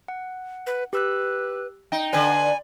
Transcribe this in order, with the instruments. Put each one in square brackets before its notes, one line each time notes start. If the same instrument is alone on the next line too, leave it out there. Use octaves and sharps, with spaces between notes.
[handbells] F#5
[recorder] B4
[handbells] G4 E6 F#6 [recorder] B4
[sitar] D#4 [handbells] G5
[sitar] D3 B4 [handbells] D5 [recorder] G#5